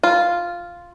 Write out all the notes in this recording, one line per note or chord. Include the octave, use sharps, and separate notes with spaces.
F4